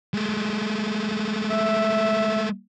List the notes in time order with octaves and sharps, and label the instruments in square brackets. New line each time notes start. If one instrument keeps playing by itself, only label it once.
[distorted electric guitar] G#3 A3
[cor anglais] E5